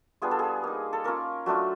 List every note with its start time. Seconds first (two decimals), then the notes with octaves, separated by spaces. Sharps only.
0.22 G3 B3 D4 F4 G#4
0.31 A4
0.39 G#4
0.64 A#3 D#4
0.93 A4
1.04 A#3 C#4 F4 A#4
1.46 F#3 A3 D4 F4